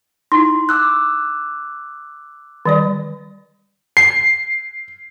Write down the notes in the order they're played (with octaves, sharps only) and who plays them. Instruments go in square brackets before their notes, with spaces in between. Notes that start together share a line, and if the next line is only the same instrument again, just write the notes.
[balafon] D#4 E4 [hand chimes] C6
[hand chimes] D6 E6 F#6
[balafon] D#3 G3 D5
[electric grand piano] C7